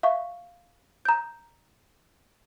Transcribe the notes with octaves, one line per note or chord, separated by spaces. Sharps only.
E5 F5 C#6
A#5 G6